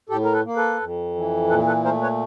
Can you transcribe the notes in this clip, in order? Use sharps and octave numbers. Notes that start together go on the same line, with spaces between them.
A2 G4 A4
A#4
A4 B4
A#3
A4 B4
F2
E3
A#2 A4 B4
A4 B4
A3 A#4 C5
B4 C#5